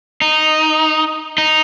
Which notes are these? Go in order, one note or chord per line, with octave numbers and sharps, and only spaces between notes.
D#4
D#4